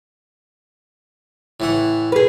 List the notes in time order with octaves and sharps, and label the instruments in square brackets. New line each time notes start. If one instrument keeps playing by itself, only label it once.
[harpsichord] A2 E3 F#5
[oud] G#4 B4